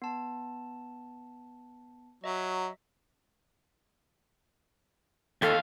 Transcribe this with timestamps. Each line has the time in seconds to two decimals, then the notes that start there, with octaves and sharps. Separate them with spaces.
0.02 B3 A5
2.24 F#3 D#5 E5
5.42 D#2 A4 F5